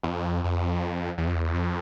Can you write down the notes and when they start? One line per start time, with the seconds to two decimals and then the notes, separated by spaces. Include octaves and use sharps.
0.03 E2
0.08 F2
0.44 F2
1.18 E2
1.27 F2
1.36 E2
1.54 F2